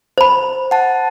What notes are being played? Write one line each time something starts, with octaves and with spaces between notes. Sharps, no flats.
C5 B5
F#5 A5